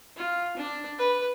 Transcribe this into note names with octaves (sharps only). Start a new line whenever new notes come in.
F4
D4
B4